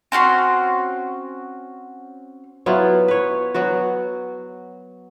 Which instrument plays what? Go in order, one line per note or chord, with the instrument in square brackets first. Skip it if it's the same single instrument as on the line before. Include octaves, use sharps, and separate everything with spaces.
[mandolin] C4 C#4 F#4 C6
[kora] F#3 B3 E4 F4
B4 C#5
F#3 B3 F#4